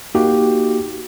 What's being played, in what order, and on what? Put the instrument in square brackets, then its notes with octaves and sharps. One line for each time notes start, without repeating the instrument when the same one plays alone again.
[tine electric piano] A#3 D#4 F#4 G4